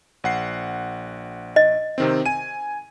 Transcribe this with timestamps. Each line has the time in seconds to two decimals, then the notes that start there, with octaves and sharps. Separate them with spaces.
0.24 A#1 F#5 C7
1.56 D#5
1.98 C3 D#3 C4
2.26 G#5 D#7